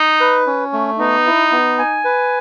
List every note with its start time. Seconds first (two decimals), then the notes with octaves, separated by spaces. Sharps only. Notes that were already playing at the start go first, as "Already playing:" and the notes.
Already playing: D#4
0.20 B4
0.47 C#4
0.73 A3
0.99 B3 D#4
1.26 E4
1.52 B3
1.79 G#5
2.05 B4